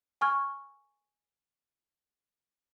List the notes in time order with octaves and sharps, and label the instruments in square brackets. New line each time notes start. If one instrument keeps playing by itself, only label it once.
[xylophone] G#5 C#6 F6 G#6